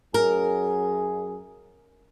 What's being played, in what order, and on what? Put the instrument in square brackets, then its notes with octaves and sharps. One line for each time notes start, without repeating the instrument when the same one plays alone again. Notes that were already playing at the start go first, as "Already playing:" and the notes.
[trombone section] F#2 G#4 [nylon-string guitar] A#4